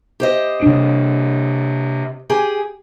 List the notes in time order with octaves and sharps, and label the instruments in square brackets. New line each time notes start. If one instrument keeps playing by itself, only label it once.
[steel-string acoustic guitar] G4 C5 D#5
[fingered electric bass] C3 D4
[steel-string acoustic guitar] G4 G#4 G#5